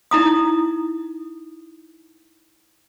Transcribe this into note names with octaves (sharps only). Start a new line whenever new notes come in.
D#4 E4 A#5 D#6